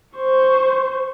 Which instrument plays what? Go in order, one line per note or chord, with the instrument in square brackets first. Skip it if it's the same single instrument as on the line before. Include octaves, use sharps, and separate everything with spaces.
[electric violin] C5 C#6